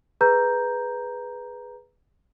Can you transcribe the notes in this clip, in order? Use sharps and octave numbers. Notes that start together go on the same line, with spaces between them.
G#4 B4 A#5 G6